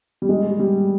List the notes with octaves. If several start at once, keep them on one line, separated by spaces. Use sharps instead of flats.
G3
G#3
G3